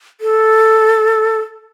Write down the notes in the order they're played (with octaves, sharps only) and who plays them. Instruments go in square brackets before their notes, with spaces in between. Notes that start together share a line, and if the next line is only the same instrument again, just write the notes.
[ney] A4